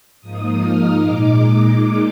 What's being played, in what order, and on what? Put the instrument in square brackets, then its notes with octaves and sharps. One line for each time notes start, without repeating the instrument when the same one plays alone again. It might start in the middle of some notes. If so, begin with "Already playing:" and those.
[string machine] G#2 F3 A#3 D#4 D#6
F6
A#2 G#3 D#4 D6